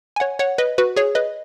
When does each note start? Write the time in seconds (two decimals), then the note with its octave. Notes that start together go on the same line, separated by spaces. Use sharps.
0.16 G#5
0.20 C#5 F#5
0.39 C#5 F#5
0.58 B4 D#5
0.78 F#4 B4
0.96 G#4 C#5
1.15 B4 D#5